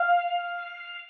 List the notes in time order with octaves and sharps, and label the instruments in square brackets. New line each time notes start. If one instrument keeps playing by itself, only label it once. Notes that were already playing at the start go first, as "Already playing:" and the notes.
Already playing: [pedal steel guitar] F5